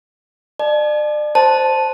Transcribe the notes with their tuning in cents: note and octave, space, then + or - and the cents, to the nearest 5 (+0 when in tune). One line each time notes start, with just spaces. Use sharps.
D5 +35 A5 -35
C5 +0 A5 -5